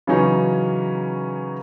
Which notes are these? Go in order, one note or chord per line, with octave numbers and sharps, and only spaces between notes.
C#3 E3 F#3 C#4 D#4